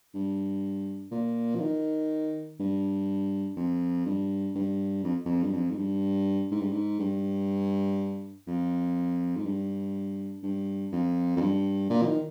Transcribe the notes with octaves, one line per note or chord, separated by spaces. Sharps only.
G2
A#2
F3
D#3
G2
F2
G2
G2
F2
F2
G2
F2
G#2
G2
G#2
G2
G#2
G2
F2
G#2
G2
G2
F2
F2
G2
A#2
F3
D#3